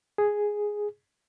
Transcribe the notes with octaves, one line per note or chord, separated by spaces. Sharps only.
G#4